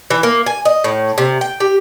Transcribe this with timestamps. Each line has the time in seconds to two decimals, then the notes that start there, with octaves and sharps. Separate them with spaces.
0.10 E3
0.23 A#3
0.46 G#5
0.65 D#5
0.84 A2
1.18 C3
1.41 G5
1.60 G4